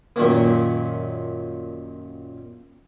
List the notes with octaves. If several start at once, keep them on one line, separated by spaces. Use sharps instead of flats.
F#2 A#2 D#3 A#3